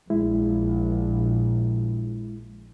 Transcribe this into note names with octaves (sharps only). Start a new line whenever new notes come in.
A#1 G#3 E4